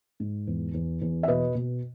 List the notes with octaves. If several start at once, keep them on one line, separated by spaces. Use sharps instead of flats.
G#2
E2
E2
E2
E5
B2 B4 D#5
B2